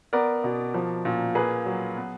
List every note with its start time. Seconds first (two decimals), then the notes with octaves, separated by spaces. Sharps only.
0.13 B3 A#4 D5
0.44 B2
0.74 F3
1.05 A#2
1.35 A#3 G#4 B4
1.66 F#3
1.97 B3